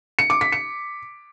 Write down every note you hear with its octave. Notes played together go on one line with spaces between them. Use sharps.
C#7
D6
B6
C#7